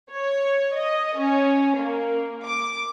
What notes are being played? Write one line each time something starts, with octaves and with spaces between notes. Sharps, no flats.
C#5
D#5
C#4
A#3
D6